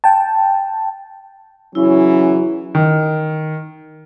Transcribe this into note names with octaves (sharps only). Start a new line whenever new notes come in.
G5 A5
C#3 E3 F#3 C#4 E4
D#3